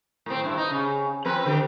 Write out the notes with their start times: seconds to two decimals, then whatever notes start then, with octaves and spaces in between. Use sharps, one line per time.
0.26 A2 C4
0.44 G2 E4
0.57 D#4
0.71 C#3
1.25 F3 C4 B4
1.46 D3 G4